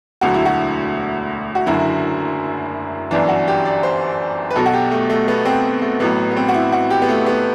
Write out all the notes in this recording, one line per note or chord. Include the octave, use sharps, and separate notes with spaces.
E1 D2 D3 F#3 F#4
E4
F#4
F#4
F#1 F#2 D3 F#3 E4
G1 F#2 E3 D4
F#4
G4
D5
C5
B4
B1 B2 F#3 A4
F#4
G4
A3
A3
B3
C4
A3
A1 A2 F#3 B3
B3
C4
F#4
E4
F#4
G4
B3
A3
B3